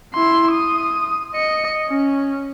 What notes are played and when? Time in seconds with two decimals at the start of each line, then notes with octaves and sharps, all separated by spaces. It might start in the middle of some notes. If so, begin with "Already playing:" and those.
0.15 E4 C6
0.52 D#6
1.34 D#5 C#7
1.88 C#4